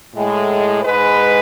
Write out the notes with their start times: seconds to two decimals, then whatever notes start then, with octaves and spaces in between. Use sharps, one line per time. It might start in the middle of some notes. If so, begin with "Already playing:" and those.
0.14 A2 G#3
0.83 G#2 G#3 B4